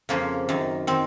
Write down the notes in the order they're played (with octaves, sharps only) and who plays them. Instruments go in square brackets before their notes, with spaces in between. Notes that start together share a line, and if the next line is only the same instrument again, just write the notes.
[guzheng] F2 C#3 F3 A#3
F#2 D#3
D#3 C4